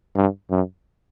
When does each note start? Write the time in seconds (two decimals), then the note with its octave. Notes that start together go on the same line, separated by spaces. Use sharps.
0.16 G2
0.51 F#2